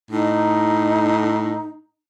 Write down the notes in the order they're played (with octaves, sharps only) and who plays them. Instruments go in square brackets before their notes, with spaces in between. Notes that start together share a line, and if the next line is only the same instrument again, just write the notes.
[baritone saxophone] A2 [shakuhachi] D#4